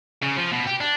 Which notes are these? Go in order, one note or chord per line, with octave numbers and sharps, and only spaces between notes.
C#3
F3
B2
G4
D4